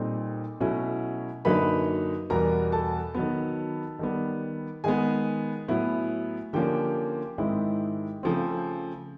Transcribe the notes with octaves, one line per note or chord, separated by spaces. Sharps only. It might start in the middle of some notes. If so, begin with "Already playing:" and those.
Already playing: A#2 G3 C4 D#4 A4
B2 F#3 A3 C#4 E4
F#2 D3 F#3 A#3 D#4 B4 B5
E2 B2 G3 B3 A#4 A#5
A4 A5
D#3 F#3 B3
D#3 G3 B3
D#3 G#3 B3 G#4 G#5
A2 F#3 B3 E4
D3 F3 A#3 C#4 G4 G5
G#2 D#3 G#3 C4 E4
C#3 F3 A3 C4